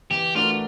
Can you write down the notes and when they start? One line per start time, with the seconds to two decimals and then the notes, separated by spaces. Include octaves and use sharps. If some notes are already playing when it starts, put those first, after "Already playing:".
0.11 E3 G4
0.35 A3 D4 F4 F#4 A#4